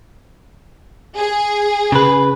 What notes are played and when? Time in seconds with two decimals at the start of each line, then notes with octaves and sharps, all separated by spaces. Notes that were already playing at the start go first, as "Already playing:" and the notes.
1.16 G#4
1.92 C#3 B4